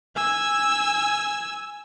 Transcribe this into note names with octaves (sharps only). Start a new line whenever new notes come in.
G#5 E6